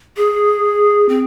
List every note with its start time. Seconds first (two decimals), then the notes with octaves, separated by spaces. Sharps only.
0.17 G#4
1.09 C4